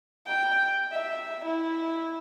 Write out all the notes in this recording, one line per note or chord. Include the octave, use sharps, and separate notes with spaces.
G5
E5
E4